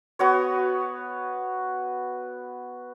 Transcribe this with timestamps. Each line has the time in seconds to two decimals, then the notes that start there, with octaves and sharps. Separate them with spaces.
0.19 B3 F#4 C#5